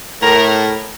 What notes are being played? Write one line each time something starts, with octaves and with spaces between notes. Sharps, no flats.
A2 A#4